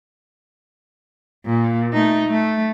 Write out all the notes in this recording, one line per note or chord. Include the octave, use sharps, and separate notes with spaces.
A#2
A3 D#4
A3